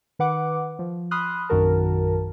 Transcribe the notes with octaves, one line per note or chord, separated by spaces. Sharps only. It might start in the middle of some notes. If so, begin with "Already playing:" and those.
D#3 B4 F#5 D6
F3
B5 C6 D#6 F6 F#6
A#1 F#2 D#3 F#4 A#4 A5